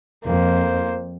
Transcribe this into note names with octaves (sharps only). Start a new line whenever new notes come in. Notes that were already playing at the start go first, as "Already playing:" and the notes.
F2 A#3 C5